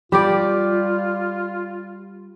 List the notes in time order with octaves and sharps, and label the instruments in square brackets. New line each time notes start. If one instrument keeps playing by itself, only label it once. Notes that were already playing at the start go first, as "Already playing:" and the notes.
[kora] G3 G4 D5 [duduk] F4